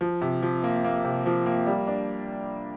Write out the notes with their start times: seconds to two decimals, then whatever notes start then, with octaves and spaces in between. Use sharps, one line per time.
0.01 F3
0.21 C3
0.43 F3
0.63 A#3
0.84 A#3
1.05 C3
1.26 F3
1.46 A#3
1.67 G3
1.87 D4